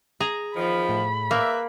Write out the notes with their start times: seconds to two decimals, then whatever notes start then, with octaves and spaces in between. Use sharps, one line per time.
0.20 G#4 A#5
0.56 E2 D#3 F3 B5
0.89 A2
1.31 A#3 B4 D5 E5